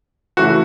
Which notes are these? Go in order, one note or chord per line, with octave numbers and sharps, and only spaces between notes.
C#3 E3 A3 F#4